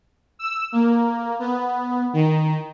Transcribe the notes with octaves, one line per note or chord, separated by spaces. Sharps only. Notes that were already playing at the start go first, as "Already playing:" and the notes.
E6
A#3
B3
D#3